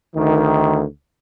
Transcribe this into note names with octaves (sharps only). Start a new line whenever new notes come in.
D2 D#3